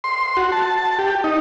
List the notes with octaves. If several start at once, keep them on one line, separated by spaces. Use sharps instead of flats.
C6
F#4
A5
G4
D#4